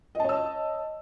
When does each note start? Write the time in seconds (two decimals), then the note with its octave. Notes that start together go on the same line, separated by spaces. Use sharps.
0.15 D#5
0.20 A5
0.24 C#5
0.29 E6